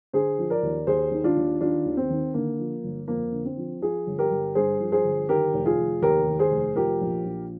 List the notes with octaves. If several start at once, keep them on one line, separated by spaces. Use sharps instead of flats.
D3 G#4 C5
F3
A#4 D5
D#2
D#2 G#4 C5
D#3
D4 F4
D#2
D#3 D4 F4
D#2
C4
D#3
D3 A#3
F3
G1
F2 A#3
D3
C4
F3
F3 F4 G#4
G1
G4 A#4
G1
G2 G#4 C5
F3
G#4 C5
G1
D#3 G4 A#4
F1
F4 G#4
F1
D#2 G4 A#4
D#3
G#4 C5
F1
F3 G4 A#4
A#1
A#1